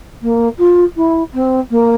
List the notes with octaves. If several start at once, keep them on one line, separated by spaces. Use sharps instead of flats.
A#3
F4
E4
C4
A#3